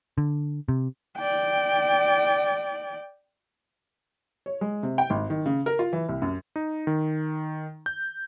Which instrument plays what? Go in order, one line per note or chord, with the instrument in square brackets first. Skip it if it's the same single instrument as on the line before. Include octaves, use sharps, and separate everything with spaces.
[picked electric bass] D3
C3
[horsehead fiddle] D5 G5
[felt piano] C#5
G#3
C3
G5
G#1
D#3
C#3
A#4
F4
E3
C2
F#2
[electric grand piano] D#4
D#3
G6